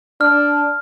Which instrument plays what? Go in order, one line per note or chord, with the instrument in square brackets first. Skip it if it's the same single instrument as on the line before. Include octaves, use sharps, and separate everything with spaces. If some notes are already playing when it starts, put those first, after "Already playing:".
[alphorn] D4 [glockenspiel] F6